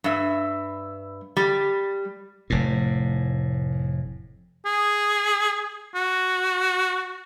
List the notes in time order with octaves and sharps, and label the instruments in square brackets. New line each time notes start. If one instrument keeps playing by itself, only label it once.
[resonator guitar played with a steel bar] G2 E5
G3
[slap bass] F1 A2
[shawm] G#4
F#4